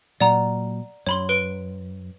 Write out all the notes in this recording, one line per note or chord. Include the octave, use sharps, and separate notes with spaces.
A#2 F#3 D5 F#5 A#5
F#2 C#5 B5 C6
B4 D7 G7